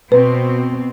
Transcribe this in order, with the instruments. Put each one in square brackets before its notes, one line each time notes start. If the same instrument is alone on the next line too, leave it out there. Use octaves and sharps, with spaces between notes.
[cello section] B2 C4 [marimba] B4